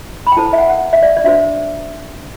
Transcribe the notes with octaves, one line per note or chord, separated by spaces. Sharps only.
B5
G5
E4 A4 C5 A5
E5
F#5
F#5
E5
D5
D5
D4 F#4 C5 E5